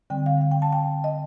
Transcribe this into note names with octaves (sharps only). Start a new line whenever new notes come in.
D3 G3 C4 G5
F5
F5
G5
A5
G5
D#5